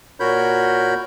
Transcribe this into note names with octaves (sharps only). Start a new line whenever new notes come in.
A#2 F#4 A#4 C#5 B5 G6